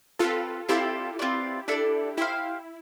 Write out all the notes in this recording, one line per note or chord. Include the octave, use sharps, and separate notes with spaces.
C4 F4 G4 A4 B4
C4 E4 F4 G4 A4 D5
C4 F4 B4 D5
D4 E4 A4 D5
E4 G4 C5 F5